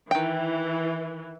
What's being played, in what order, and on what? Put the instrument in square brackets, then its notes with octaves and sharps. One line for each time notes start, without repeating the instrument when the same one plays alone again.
[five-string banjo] D#3 G5 [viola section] E3